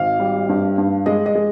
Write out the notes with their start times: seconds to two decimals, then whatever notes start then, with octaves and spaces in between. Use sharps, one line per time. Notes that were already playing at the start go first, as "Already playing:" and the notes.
Already playing: G#1 F5
0.20 G3
0.49 G2
0.78 G2
1.06 G#3 D#5
1.26 D#5
1.35 G#3